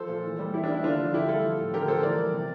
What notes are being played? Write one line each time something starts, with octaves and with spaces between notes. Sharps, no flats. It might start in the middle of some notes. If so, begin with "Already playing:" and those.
Already playing: F3 A4 C5
A#2
E3
G3
E3 E4 G4
D4
G3
E4
D3 D4 F4
F3
D3 E4 G4
G3 F4 A4
F3
A2
D3 G4 A#4
F3 A4 C5
E3 A#4 D5
G3
C3